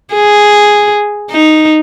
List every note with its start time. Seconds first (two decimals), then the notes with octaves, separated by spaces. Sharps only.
0.14 G#4
1.31 D#4